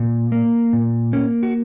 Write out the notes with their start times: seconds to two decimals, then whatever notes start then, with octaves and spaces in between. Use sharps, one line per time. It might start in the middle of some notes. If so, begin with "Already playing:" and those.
Already playing: A#2
0.32 A#3
0.73 A#2
1.13 A#3 C#4
1.43 F#4